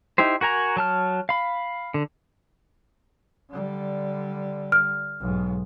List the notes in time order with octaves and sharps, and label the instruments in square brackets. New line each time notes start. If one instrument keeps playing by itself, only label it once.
[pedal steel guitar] D#4 E4 G4 C5
F#4 A#4 G#5 A#5
F#3 A5 F6
F5 B5
D3
[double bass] D3 G3
[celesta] F6
[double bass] B1 G#2